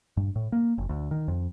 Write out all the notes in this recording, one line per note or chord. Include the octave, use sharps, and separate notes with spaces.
G2
A2
A#3
F#1
D2
D#3
F2